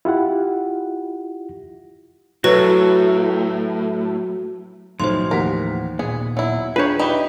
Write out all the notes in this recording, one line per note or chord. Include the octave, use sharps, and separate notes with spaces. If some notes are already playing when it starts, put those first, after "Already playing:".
E4 F4 G4 F#5
A2 F#3 F#4 A4 B4
B1 A2 E3 F3 C5 C6
D#2 A#4 F#5 B6
A#2 B3 G#4
F#3 E4
D4 F4 G#4 B4 C#5
D#4 G4 B4 E5 G5 B5